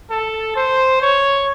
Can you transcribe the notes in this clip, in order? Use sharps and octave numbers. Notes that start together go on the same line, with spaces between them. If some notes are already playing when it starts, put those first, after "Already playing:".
A4
C5
C#5